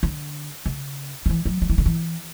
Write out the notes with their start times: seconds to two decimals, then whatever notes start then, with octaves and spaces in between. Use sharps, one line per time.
0.03 D3
0.66 C#3
1.26 D3
1.29 E3
1.46 F#3
1.62 F#3
1.70 E3
1.78 D3
1.86 E3